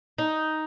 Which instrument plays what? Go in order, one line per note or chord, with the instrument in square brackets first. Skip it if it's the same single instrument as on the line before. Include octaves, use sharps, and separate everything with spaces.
[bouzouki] D#4